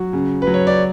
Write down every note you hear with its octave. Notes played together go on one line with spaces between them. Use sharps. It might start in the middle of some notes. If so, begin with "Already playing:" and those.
Already playing: F#3 F#4
C#3
B4
F#3
C#5
D5